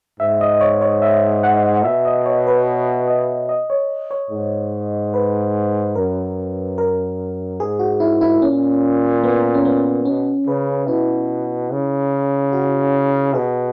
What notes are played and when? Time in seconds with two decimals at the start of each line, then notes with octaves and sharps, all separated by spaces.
0.20 G#2 E5
0.41 D#5
0.61 C#5
0.81 C#5
1.02 E5
1.43 F#5
1.84 B2 E5
2.05 D#5
2.26 C#5
2.47 B4
3.08 D#5
3.49 D#5
3.70 C#5
4.11 C#5
4.30 G#2
5.14 B4
5.95 F#2 A#4
6.78 A#4
7.60 G#2 G#4
7.79 F#4
8.00 E4
8.21 E4
8.42 A#2 C#4
9.23 B3
9.54 C#4
9.65 B3
10.05 B2 C#4
10.46 C#3 B4
10.88 B2 E4
11.71 C#3
12.53 F#4
13.34 B2 G#4